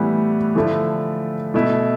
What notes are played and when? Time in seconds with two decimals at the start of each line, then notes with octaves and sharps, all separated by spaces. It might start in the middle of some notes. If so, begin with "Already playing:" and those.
Already playing: A2 E3 G3 B3 E4
0.55 D3 F3 A3 E4
1.54 B2 A3 E4